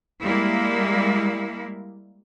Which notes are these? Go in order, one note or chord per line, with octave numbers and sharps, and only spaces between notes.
G3 G#3 A#3 E4